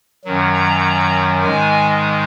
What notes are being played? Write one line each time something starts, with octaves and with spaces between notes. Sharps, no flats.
F#2 D#3 F#3
A#5
G#2 D#3 G#3 G#5